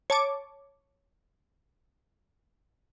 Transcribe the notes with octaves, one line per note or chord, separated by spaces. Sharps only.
C#5 A5 D6